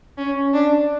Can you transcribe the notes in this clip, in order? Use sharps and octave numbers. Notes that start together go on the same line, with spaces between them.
C#4
D4